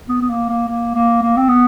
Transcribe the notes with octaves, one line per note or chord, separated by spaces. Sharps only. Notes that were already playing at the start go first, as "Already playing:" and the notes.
B3
B3
A#3
A#3
A#3
A#3
A#3
C4
B3